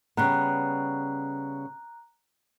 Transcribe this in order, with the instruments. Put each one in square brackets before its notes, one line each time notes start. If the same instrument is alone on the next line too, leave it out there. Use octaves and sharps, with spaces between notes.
[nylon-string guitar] C#3 G3 B3 [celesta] A#5 F#6